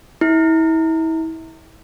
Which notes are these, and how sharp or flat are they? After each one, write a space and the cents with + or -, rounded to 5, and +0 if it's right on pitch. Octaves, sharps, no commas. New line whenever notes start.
E4 -35